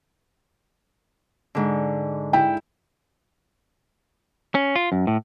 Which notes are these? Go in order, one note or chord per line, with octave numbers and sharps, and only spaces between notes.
G#2 D3
E4 G5
C#4
F4
F#2
A2